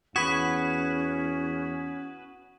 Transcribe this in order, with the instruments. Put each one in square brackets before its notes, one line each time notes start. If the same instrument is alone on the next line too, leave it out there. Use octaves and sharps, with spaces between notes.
[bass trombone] E2 [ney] C#4 [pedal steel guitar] F#4 B4 [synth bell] D#6 G#6 B6